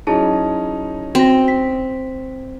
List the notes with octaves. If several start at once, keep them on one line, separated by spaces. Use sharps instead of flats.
F#3 C#4 D#4 E4 G#4 A5
C4 F#4 A#6
B6